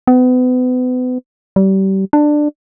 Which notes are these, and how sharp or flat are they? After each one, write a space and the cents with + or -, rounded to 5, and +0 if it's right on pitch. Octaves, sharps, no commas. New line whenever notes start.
B3 +35
G3 -30
D4 +15